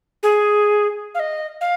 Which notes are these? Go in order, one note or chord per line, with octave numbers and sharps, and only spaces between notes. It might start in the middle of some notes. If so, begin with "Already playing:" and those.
G#4
F5
D#5
F5